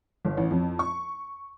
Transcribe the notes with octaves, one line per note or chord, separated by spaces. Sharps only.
G1
A1
F2
C#6